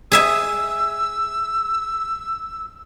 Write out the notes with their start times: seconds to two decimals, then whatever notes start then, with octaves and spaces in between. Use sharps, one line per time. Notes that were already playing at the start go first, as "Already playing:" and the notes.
0.12 G#4 E5 G#5 E6